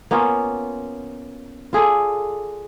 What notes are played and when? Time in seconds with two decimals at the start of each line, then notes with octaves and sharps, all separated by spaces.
0.11 A#3 B3 C#4 F4
1.73 F4 G#4 A4 D5